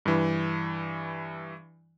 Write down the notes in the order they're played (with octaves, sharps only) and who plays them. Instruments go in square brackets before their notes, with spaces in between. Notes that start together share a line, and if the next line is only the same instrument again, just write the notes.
[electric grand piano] G2 E3